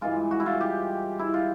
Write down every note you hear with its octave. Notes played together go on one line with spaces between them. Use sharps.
G2 E3 G#3 F4
F#4
E4
F4
G4
E4
F4